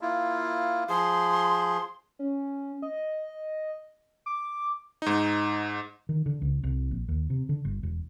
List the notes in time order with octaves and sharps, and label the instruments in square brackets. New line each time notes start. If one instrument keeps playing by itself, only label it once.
[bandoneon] A#3 E4 F4
[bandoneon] F3 G#4 [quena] C6
[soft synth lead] C#4
D#5
D6
[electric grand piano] G#2 D#4
[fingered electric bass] D#3
D3
C#2
C2
A#1
D#2
C3
D3
G1
E1